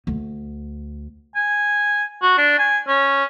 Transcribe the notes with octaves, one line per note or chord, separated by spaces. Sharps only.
D2
G#5
F#4
D4
G#5
C#4